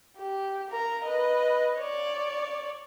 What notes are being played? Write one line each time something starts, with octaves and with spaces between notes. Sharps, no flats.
G4
A#4 A#5
B4 D#5
C#5 D5